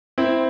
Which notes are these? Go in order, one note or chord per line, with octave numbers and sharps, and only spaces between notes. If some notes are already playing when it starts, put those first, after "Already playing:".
C4 E4